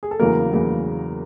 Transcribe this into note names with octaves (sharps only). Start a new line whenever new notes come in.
G#4
A4
E2 C#3 F#3 A#3 A#4
E2 C#3 F#3 A#3